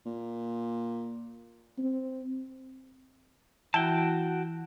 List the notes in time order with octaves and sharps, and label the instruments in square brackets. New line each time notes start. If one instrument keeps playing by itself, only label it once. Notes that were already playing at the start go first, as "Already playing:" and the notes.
[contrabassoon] A#2
[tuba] C4
[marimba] E3 E4 [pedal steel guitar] F#4 G5 A5